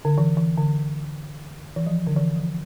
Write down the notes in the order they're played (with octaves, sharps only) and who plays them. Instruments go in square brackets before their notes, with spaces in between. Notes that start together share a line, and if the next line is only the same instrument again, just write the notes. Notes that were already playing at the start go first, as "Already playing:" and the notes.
[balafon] D3
E3
E3
D3
E3
F3
D3
E3
F3